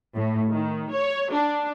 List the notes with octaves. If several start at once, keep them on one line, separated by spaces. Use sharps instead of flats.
A2
D#3
C#5
D4